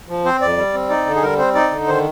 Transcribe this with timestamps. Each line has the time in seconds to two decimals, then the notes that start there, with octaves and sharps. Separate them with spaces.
0.09 F3
0.25 C4 C5
0.42 F2 D5
0.58 G3
0.74 C4
0.89 D#4 D5
1.06 D3
1.16 G#4
1.23 G3 A#4
1.38 C4 C5
1.55 D#4 D5
1.71 D3
1.87 D#3 C5